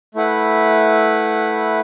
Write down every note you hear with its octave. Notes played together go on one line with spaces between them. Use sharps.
A3 E4 B4 F#5